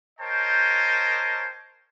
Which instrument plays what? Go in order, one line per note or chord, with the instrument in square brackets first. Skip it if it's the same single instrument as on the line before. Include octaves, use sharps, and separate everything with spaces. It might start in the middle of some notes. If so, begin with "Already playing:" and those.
[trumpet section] A#4 C5 C#5 D#5 G5 A5